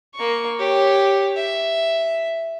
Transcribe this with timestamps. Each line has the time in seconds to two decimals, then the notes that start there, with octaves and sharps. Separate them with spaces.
0.15 A#3 C#6
0.59 G4 C#5
1.36 E5